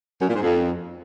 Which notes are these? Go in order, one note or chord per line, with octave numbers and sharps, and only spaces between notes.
F#2
A#2
G#2
F2